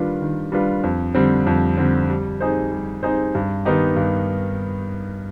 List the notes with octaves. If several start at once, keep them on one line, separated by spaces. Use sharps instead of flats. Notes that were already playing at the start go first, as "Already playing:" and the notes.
Already playing: D#3 G3 D4 F4 B4
D#3
G3 D4 F4 B4
F2
D3 G3 C4
F2
D3 G3 C4
G3
C4 D#4 G#4 C5
G3
C4 D#4 G#4 C5
G2
D#3 B3 D#4 G4
G2